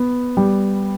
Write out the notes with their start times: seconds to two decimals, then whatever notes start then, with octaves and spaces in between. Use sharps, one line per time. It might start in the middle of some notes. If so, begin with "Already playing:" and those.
Already playing: B3
0.37 G3